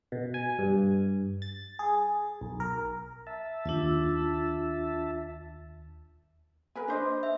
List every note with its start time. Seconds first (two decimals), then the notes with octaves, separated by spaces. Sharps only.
0.12 B2
0.34 G#5
0.59 G2
1.42 A6
1.79 G#4
2.41 B1
2.60 A#4
3.27 E5 A5
3.66 D#2 D4 F4 E6
6.75 A#4 B4 G#5
6.88 D4 C5 D#5
7.23 E5